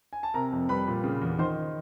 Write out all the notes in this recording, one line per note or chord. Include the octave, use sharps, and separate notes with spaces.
G#5
A5
C3 A#4 A#5
F2
G3 B4 B5
A#2
C#3
E2
D#3 C5 C6